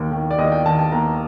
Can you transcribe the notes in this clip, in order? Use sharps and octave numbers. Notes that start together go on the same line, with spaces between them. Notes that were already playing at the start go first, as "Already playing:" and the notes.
Already playing: D#2 D#3
D#3
D5
D#2 D#5
G5
D#3 A5
A5
D#2 A#5